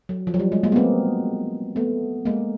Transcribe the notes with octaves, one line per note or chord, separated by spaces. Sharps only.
F#3
F3
F#3
G3
G#3
G#3 A#3
B3
A#3 C4
A3 B3
G#3 A#3